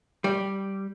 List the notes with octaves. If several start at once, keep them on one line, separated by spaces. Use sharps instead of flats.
G3